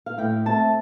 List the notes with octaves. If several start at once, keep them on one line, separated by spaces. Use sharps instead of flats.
F5
A2 G5
A3 C4 A5